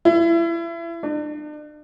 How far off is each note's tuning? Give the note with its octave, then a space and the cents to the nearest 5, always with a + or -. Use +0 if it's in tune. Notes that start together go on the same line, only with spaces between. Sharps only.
E4 +30
D4 +40